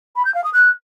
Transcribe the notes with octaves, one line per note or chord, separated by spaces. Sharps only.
B5
G6
F5
D#6
F#6